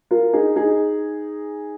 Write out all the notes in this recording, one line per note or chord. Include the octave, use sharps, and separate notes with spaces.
F4 A#4
D#4 G#4
D#4 G#4